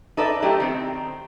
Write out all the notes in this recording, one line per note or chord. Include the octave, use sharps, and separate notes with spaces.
D#4 A4 B4 D5 E5
F#3 A3 D#4 E4 G4
D#3 C4